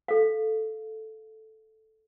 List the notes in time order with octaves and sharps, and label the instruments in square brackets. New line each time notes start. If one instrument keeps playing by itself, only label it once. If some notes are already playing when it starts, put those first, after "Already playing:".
[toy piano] A4 F5